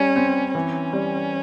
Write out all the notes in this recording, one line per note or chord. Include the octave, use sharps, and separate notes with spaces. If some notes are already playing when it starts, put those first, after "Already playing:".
Already playing: G3 C#4
C4
E3 C#4
G3